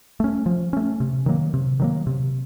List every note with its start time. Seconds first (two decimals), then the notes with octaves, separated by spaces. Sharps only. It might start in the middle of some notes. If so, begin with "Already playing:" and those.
0.20 A3 C#4
0.46 F3
0.73 A3 C#4
1.00 C3
1.26 D#3 F#3 A#3
1.54 C3
1.80 D#3 F#3 A#3
2.07 C3